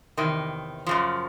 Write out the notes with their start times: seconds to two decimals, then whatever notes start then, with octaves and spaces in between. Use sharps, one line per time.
0.17 E2 C3 D#3
0.86 F#2 C#3 F3